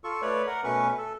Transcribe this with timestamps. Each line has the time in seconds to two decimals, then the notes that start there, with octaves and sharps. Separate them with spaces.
0.04 F4 A4 C#6
0.22 A3 B4 C#5 D5
0.47 A#4 F#5
0.64 B2 A3 C#4 B4 C#6
0.98 A4